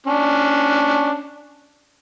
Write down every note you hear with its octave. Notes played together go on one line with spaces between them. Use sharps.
C#4 D4